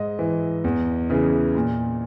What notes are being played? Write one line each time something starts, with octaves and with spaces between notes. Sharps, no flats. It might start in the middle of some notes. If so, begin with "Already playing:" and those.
Already playing: G#2 D#5
E3
E2
C#3 E3
A#2